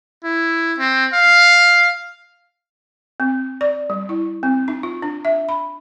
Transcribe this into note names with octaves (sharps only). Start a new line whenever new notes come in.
E4
C4
F5
C4
D5
G3
E4
C4
D#4
F4
D4
E5
B5